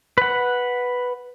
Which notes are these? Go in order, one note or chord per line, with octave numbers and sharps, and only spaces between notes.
B4 F#5